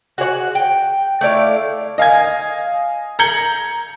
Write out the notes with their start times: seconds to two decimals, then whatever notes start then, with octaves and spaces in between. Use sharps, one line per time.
0.18 F#4 G#4 C#5 F#5
0.55 G5
1.21 A3 E4 D5 F5
1.98 D#5 F5 G#5 G#6
3.19 A#5 G6 G#6 C#7 F#7 G7